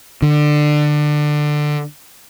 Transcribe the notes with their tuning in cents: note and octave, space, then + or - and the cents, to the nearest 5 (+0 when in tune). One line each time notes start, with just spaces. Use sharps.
D3 +20